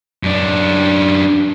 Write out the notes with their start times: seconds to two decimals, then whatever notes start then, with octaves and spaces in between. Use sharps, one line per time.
0.23 F#2 D4